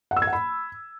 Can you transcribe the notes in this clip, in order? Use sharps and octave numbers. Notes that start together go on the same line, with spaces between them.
F#5
E6
G#6
F#5
B5